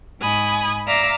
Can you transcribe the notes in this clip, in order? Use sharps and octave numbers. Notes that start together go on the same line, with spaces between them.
G#2 G#5 B5 D#6
D5 E5 F5 A#5 D6 E6